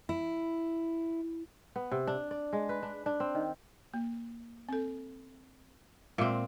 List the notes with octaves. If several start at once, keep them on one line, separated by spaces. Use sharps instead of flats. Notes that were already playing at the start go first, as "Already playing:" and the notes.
E4
B3
C3
D4
D5
G#3
B4
D4
D4
C4
D#3
A#3
C4 A4
A#2 G#3 C4 F4 E5